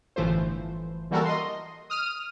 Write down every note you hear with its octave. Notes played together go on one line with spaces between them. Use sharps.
G1 A2 E3 F3 A3 C5
E3 G3 A#3 F#4 A4 A#4
D#5 C6
D#6 F6 D#7